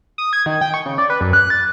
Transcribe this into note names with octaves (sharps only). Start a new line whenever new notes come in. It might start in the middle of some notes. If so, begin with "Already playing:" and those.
D#6
G#6
D#3
G5
C#6
C#3
D5
B4
F#2
F#6
A6